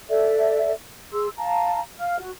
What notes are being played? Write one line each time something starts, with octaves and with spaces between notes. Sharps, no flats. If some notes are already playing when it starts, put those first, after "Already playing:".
A4 D5 E5
G#4 C6 E6
F5 A5 A#5
F5 F6
F#4